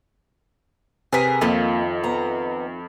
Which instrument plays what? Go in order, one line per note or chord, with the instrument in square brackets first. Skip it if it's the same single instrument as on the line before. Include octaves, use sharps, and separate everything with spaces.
[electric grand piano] C3 B4 B6 [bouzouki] G#4 A#4
[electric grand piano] F2 [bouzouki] D#3 F4 E5 [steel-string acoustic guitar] A#3
[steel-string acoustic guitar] B3 A#5